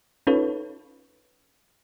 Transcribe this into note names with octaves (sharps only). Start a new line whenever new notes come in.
C#4 D#4 F4 A4 B4 C#5